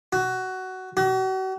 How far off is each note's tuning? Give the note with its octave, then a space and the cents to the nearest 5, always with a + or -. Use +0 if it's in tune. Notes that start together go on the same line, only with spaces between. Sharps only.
F#4 +15
F#4 +40